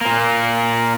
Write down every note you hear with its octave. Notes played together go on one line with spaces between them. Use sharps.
A#2 A#3